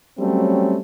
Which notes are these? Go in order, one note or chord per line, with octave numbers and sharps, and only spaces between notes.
F#3 G3 A3 C4 C#4